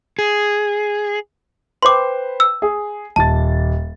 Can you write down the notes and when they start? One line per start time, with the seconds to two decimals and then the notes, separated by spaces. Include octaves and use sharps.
0.19 G#4
1.83 B4 C5 G5 C6 D6
2.40 E6
2.62 G#4
3.16 D#1 A5 A6